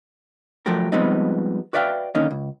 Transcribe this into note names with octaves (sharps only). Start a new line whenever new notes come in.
F3 F#3 A3 G4 A#4
F3 G3 G#3 B3 C4 D#4
F#4 B4 D5 E5 F5 G5
D3 D#3 A#3 C#4 D#4
C#2